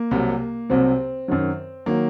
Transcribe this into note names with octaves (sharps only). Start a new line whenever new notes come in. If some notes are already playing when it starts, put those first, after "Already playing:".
Already playing: A#3
C2 C3 F#3
C2 C3 F#3 C4
F#2 D#3 F#3
D#3 F#3 A#3